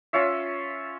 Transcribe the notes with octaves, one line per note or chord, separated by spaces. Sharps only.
C#4 F4 C#5 E5